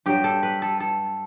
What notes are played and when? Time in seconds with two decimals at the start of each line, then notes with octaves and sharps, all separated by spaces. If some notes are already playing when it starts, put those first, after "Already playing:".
0.06 G2 F#3 G4
0.24 A4
0.43 B4
0.62 A4
0.80 A4